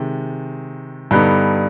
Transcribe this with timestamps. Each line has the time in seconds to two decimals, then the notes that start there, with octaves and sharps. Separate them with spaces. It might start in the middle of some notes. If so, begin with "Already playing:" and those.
Already playing: C3 D#3 G#3
1.11 G2 D3 G3 B3 D#4